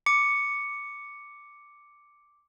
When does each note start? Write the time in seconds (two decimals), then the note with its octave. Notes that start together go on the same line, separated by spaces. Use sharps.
0.06 D6 C#7